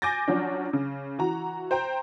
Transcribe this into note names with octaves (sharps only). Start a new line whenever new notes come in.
G#5 D6 G6 A6 A#6
F3 F#3 C#4 D4
C#3
E3 F#4 A#5
C5 G5 A#5